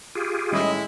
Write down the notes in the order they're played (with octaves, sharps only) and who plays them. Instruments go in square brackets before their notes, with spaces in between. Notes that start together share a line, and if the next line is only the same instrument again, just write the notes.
[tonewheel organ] F4 G4 G#4
[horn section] A2 G#3 E4 [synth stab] D#3 G3 C#4 [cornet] D#5